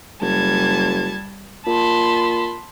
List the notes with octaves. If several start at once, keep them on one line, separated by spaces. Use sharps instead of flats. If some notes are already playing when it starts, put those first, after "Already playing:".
F#1 G3 A5 G#6
A#2 A5 B5 C6